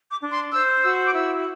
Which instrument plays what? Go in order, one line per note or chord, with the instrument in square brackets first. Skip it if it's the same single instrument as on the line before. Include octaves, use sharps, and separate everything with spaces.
[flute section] D6
D4
C6
C5 E6
F#4 E6
D6
E4 E6